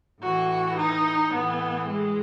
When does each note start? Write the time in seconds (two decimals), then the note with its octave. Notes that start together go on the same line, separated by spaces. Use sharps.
0.21 A2 E3 F#4
0.77 D#4
1.31 A2 E3 B3
1.87 G#3